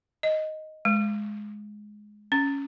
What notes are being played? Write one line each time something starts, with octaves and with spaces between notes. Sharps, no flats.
D#5
G#3
C#4